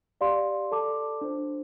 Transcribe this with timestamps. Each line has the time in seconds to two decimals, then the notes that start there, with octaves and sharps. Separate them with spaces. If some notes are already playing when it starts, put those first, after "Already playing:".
0.21 G4 D5 F5 C6
0.71 A4 D5 A5 D6
1.21 D4 F4 C5